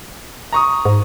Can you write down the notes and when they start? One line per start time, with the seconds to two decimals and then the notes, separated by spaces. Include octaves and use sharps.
0.53 A#5 C#6 D#6
0.85 G#2